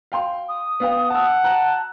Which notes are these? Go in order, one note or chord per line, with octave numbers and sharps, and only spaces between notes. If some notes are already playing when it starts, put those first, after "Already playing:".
F5 G5 C6
D#6
B3 F5 G5
F#5 A5 E6
A5 A#5 F#6